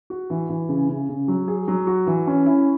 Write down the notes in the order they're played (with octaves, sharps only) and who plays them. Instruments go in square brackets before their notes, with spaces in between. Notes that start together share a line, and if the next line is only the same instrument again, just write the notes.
[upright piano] F#4
E3
E3
C#3
C#3
C#3
F#3
G#4
F#3
F#4
E3
C#4
E4